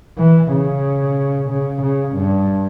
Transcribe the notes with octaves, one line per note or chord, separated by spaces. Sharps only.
E3
C#3
C#3
C#3
G2